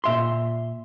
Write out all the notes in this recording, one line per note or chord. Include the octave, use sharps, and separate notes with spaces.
A#2 E5 C6